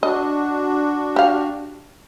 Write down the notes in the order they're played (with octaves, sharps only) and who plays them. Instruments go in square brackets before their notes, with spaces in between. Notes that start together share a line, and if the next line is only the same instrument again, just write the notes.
[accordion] D4 F#4 [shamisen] D#5
[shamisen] G4 F5